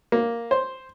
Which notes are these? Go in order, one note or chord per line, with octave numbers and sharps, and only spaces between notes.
A#3
C5